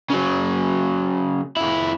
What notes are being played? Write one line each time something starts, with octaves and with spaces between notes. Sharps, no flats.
C#3 F#3
F2 E4